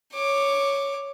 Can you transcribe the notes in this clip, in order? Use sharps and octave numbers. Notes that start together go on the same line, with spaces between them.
C#5 D6